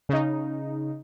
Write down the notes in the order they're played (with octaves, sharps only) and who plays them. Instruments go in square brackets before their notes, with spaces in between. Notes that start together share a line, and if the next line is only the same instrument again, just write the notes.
[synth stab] C#3 D#4